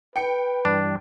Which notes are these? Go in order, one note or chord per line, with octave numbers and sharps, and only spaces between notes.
B4 G5 C#7
G2 E3 G3 D4